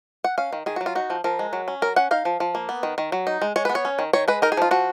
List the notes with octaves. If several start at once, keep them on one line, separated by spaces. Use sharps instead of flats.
F#5
C#4 F5
D#3
D#3 G#4
F#4
F#3
F4
D#4 F#4
F3
F3 A#4
G#3
F#3
C#4
F#3 A#4
C#4 F#5
D#4 F5
F3
F3
A#3
B3
D#3
D#3
F#3
D#4
G#3
G#3 C#5
B4
B3
C#5
C#4
D#3
D#3 C#5
G#3 B4
D#4 A#4
G#4
F3 F4
F3 F#4